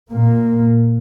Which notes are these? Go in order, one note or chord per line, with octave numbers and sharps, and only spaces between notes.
A#2 A#3